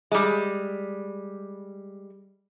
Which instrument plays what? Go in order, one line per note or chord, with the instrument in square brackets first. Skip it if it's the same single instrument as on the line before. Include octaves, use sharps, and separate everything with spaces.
[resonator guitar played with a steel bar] G3 G#3